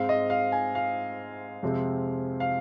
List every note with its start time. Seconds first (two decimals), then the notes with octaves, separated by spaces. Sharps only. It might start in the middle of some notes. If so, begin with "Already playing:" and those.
Already playing: G#2 G#3 C4 F5
0.09 D#5
0.30 F5
0.52 G#5
0.75 F5
1.63 F2 C3 G#3 C4
2.40 F5